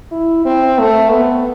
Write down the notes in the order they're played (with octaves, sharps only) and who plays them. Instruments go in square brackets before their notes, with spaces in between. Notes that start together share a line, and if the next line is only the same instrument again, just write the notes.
[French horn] E4
C4
A3
B3